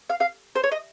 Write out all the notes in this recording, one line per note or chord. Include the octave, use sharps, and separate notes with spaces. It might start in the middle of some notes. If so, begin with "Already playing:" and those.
F5
F5
C5
C#5
D#5